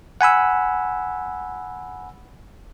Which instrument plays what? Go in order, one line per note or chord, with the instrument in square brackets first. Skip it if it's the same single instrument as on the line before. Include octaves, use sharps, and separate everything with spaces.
[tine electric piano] F#5 G#5 B5 E6